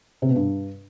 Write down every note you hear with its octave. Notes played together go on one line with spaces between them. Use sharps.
C3
B2
G2